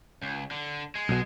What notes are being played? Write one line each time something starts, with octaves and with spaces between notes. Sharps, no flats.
C#2
D3
G#3
B1 B2